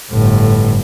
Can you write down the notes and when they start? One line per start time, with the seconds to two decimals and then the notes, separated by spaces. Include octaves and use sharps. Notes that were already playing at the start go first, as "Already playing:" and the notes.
0.11 G1 A2